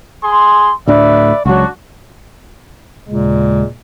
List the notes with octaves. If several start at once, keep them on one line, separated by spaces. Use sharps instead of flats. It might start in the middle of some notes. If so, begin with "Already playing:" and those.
G#4 C6
D2 A2 D4 B4 D5 E5
C#2 F#3 D4 F#4
D#2 A#2 C#3 G#3